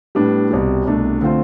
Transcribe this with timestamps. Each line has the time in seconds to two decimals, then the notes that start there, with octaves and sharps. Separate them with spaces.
0.15 A2 G3 B3 D4
0.51 C2 B2 G3
0.85 C2 B2 A3 D4
1.21 D3 A3 C4 F4 C5